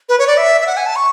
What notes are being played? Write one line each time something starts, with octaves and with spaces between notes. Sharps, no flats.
B4
C#5
D5
E5
E5
F#5
G#5
A5
C#6